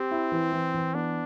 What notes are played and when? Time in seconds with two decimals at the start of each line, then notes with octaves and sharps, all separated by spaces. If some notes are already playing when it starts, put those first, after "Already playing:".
Already playing: C4 G4
0.11 E4
0.32 E3
0.52 E3
0.74 E3
0.94 B3 D4